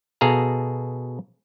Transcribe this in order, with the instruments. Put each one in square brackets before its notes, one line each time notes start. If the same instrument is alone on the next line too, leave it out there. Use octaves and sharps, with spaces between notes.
[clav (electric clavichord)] B2 G#4 A4 F5 A#5